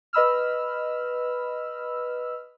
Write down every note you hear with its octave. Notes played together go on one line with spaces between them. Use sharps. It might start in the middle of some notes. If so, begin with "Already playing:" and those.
B4 D#5 B5 E6 F6